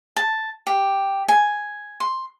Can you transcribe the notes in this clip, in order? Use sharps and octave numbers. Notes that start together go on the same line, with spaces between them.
A5
G4
G#5
C6